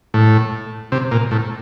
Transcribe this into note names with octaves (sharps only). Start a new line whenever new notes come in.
A2
C3
A#2
A2